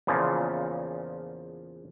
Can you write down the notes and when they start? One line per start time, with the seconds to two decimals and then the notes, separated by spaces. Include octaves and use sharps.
0.07 E2 A#2 C#3 F3